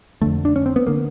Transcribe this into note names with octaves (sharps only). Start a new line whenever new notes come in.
F2 D3 A3
D4
C#4
C4
B3
D3 A#3